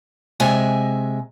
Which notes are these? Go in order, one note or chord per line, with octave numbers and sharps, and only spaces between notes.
C3 G#3 E5 G#5